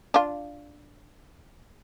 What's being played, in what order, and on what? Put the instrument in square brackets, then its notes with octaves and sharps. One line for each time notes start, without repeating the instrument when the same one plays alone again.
[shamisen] D4 F4